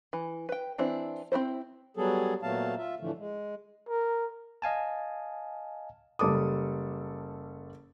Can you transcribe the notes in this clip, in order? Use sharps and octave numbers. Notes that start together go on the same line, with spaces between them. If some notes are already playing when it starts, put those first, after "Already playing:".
E3
B4 G5
E3 C4 D4 E4
C4 D#4 E4 C5
F#3 G3 B3 G#4 A4
A#2 F#3 A3 B3 F5 A5
F4 E5
A2 D3 E3 F3 A3
G#3
A#4
D#5 F5 G#5 A5
F#1 G3 A4 D6 D#6